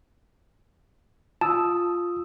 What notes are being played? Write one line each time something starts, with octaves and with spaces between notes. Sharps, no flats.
F4 A5 D#6 E6